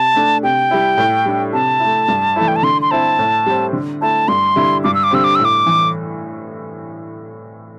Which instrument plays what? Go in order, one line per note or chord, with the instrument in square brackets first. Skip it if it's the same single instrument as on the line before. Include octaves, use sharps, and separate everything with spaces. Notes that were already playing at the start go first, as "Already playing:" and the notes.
Already playing: [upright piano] C3 [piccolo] A5
[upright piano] A3 D4
[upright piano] C3 [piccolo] G5
[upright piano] G3 E4
A2
G3 D4
[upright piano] C3 [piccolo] A5
[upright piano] A3 E4
G2
E3 A3 E4
[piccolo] G5
A5
[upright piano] D3 [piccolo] C6
[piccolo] C6
[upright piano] C4 E4 [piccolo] A5
[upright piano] A2
G3 C4
D3
[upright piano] A3 E4 [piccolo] A5
[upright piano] G2 [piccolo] C6
[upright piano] D3 G3 E4
[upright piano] G2 [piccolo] D6
[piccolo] E6
D6
[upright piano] D3 G3 C4 [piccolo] E6
[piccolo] D6
[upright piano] A2 [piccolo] E6
[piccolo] D6
[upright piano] E3